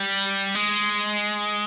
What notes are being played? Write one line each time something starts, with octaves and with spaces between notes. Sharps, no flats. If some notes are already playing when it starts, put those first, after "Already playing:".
Already playing: G3
G#3